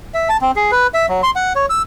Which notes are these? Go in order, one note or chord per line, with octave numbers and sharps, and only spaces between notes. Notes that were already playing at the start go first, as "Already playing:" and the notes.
E5
A5
C4
G#4
B4
E5
F#3
C6
F#5
C#5
E6